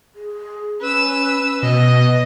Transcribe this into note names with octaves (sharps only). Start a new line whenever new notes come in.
G#4
C#4 B4 E6
B2 B4 D#5